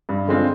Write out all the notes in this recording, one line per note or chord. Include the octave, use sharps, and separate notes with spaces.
G2
D3 G#3 C4 F4